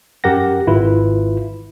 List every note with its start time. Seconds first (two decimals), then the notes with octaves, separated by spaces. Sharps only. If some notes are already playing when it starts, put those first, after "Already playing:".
0.24 F#2 G4 A#4 F#5 A#6
0.67 G#1 E4 F4 B4